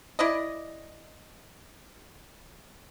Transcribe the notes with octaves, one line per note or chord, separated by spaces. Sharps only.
E4 D5 D#5